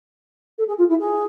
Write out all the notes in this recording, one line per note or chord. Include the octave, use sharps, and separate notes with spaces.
A4
G#4
F4
E4
G#4